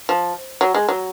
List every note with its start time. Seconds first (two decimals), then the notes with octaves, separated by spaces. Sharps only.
0.09 F3
0.61 F#3
0.75 G#3
0.89 F#3